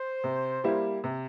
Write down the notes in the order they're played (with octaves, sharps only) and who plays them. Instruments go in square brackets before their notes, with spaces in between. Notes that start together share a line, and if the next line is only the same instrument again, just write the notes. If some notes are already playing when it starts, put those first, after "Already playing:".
Already playing: [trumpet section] C5
[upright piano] C3
G3 A#3 E4 G4
C3